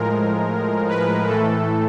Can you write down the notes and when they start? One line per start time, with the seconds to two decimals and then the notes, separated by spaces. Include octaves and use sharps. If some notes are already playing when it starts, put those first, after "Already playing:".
Already playing: A2 F3 G#3 A#4
0.88 B4
1.27 A2 E3 A3 A4